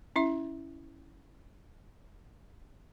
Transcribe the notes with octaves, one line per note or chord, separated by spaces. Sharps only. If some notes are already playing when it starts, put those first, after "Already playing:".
C#4 E4 E5